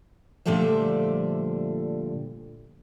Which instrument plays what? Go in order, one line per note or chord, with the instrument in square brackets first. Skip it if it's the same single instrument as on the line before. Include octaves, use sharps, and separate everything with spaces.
[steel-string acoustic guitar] A#2 D3 F3 G3 A3 E5